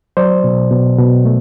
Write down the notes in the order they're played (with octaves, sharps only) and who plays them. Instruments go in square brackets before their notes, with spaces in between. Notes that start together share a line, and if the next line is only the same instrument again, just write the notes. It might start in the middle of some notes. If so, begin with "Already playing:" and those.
[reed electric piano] F#3 C5 D5
B2
B2
B2
A3